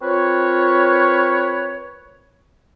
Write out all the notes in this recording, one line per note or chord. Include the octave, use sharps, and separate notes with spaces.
C4 F4 A#4 B4 C#5